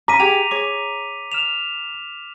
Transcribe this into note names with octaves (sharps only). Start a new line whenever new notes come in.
C#4 A#5 D6 B6 D#7
G4 G#4 F7
G#4 C#5 D6
F6 E7 F7